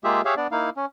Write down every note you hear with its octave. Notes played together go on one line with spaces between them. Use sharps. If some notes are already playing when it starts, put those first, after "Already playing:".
G#3 A#3 F4 G4 G#4 E5
G4 G#4 C#5 E5 F5
B3 D4 D5
A#3 D#4 E4 F5
C#4